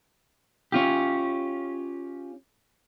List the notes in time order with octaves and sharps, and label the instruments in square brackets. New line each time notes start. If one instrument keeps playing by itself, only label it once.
[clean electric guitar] C#4 F4 G4